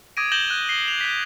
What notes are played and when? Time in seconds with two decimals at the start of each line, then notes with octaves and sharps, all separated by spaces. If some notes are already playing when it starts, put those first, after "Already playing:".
0.17 D6 D#6 G#6 A#6 D7 D#7
0.32 G6 A#6 E7 F#7 G7
0.50 F#6
0.69 C7 G7
0.88 E7 F7
1.01 G6 B6